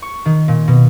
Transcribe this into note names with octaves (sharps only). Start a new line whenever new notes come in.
C#6
D#3
A#2
B2